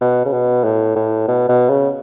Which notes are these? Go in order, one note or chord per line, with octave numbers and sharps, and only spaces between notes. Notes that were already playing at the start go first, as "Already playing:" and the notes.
B2
C#3
B2
A2
A2
B2
B2
C#3